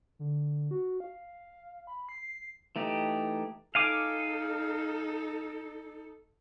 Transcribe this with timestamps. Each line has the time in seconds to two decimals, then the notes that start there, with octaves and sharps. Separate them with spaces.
0.19 D3
0.71 F#4
1.00 F5
1.87 B5
2.09 C7
2.76 E3 A3 D#4 G4
3.75 D#4 A4 F5 G#5 D6